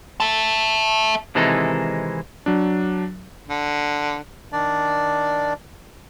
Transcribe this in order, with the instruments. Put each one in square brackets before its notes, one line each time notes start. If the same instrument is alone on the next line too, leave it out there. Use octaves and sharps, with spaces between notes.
[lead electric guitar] E5 A5
[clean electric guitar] C3 D#3 E3 G#3 D#4 A4
[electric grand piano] F#3 D4
[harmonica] D3
[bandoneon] D#3 D4 D5